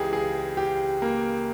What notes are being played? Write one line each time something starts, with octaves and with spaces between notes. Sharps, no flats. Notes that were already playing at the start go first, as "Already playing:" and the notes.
Already playing: C#2 C#3 E3 G4 G#4
G#4
G4
A#3